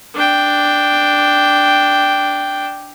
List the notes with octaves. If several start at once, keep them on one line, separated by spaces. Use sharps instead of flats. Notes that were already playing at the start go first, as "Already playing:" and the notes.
D4 G5